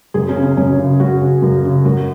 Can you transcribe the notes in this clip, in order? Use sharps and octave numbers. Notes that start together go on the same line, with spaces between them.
F#2 G#4
C#4
C#3
C#4
F#2 C#4
C#3
F#2 F#4
C#3
F#2
C#3
F#2 F#4